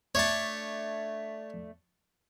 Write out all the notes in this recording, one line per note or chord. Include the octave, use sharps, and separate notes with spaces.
A3 D4 C#5 D5 A5